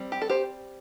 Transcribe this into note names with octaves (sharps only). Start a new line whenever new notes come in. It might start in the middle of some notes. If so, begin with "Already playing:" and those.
Already playing: G3 C4
G4
A4
G4 C5